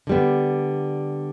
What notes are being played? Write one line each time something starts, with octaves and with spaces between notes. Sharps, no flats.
D3 G3 B3